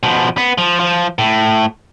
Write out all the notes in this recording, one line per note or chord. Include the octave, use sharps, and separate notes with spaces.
B2 F3
B3
F3
F3
A2